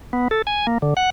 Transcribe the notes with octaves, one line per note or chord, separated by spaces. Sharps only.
B3
A4
G#5
A#3
D3
F#5